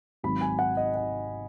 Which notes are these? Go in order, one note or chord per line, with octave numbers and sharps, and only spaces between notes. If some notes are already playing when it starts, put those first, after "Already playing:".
G#1 G#2 D#3 F#3 B5
G#5
F#5
D#5
F#5